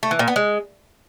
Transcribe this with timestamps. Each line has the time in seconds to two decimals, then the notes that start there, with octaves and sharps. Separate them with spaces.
0.03 A3
0.11 E3
0.19 A#2
0.28 B3
0.36 G#3